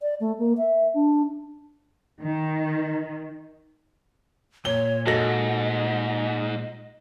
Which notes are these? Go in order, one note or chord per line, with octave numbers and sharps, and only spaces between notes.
D5
A3
A#3
E5
D4
D#3
A#2 C#5 G7
G#2 F#3 A4 D#5 A#6